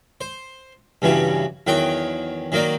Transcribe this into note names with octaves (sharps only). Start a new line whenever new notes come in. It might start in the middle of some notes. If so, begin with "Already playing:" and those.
C5
G2 C#3 E3 G3 F#4
E2 D#3 F#3 F#5 G5 D#6
D#3 F#3 A#3 D#4 D5